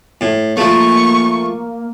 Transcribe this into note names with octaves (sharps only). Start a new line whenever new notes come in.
A2
F3 A3 A#3 C#6